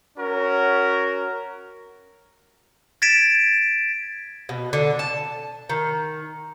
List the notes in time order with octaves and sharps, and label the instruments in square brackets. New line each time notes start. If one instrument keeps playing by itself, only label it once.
[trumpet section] C#4 F#4 A#4
[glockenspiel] G#6 A6 B6 D7 E7
[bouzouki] B2
D3
A5
D#3